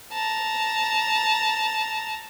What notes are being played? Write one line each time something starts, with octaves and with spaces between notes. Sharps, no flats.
A5 A#5